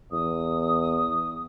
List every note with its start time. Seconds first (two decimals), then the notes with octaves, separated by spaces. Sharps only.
0.12 E2 D#6